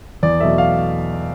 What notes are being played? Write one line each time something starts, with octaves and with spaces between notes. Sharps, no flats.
E2 D5
B2 F#3 A3 E5
F5